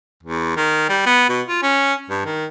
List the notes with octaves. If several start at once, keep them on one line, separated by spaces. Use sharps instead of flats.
E2
D#3
G3
B3
B2
F4
C#4
G2
D#3